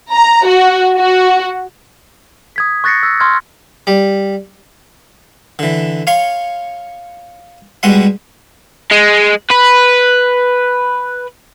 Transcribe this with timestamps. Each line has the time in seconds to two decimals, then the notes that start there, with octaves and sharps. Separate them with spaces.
0.13 A#5
0.46 F#4
0.96 F#4
2.56 D#6 G#6 B6
2.84 C#6 F#6 A6 A#6 C7 C#7
3.03 E6
3.20 C6 C#6 F6 G#6
3.87 G3
5.59 D3 E3
6.07 C#5 F5 C6 C#6
7.83 B2 G3 G#3 F#5 C6
8.91 G#3
9.50 B4